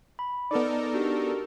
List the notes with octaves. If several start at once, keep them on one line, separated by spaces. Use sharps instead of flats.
B5
B3 D#4 A4 A#4 D5 D6
D4 F#4 G4